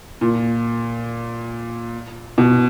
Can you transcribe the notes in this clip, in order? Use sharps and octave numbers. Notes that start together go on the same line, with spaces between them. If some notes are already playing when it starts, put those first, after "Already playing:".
A#2
B2